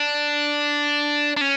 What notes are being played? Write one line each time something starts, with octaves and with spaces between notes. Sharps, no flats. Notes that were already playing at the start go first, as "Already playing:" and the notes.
Already playing: D4
D4
C#4